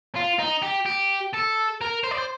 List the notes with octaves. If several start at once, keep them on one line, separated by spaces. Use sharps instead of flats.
F4
D#4
G4
G4
A4
A#4
C5
D5
C5